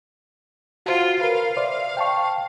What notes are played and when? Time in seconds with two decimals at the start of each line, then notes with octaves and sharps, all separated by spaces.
0.86 F4 F#4 C5
1.21 A#4 B4 F5
1.57 C5 D5 E5
1.97 G5 A5 C#6